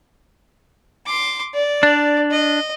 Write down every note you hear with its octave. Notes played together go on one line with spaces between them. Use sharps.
C6 D6
D5
D4
D#5